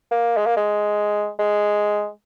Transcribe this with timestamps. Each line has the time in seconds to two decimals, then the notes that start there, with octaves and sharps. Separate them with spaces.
0.11 A#3
0.37 G#3
0.46 A#3
0.57 G#3
1.39 G#3